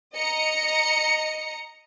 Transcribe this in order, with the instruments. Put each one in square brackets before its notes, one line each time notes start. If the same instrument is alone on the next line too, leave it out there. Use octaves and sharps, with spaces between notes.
[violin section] D#5 A#5 C#7